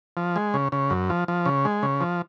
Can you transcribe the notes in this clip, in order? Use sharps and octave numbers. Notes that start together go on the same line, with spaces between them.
F3
G#3
C#3
C#3
F#2
F3
F3
C#3
G#3
C#3
F3